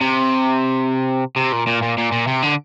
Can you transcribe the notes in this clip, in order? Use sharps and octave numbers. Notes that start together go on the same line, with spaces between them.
C3
C3
A#2
A#2
A#2
A#2
A#2
C3
D3